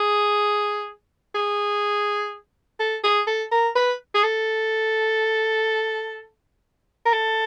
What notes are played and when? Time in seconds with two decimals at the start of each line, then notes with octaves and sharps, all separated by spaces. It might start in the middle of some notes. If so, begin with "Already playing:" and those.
Already playing: G#4
1.35 G#4
2.80 A4
3.04 G#4
3.27 A4
3.52 A#4
3.76 B4
4.15 G#4
4.23 A4
7.06 A#4
7.13 A4